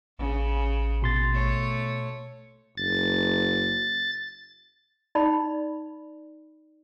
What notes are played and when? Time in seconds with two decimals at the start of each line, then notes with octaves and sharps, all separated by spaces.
0.19 A1 C#3
1.02 B2 C6 A6
1.32 A3 C#5
2.77 F#1 A6
5.15 D#4 D5 B5